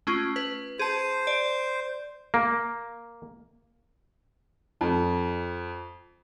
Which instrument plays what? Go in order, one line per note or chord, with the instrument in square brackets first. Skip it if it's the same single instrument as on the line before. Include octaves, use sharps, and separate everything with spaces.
[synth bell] A3 C#4 F4
B4
[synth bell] G#4 A5 [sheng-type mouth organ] C5
[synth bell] D5
[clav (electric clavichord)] A#3
[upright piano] F2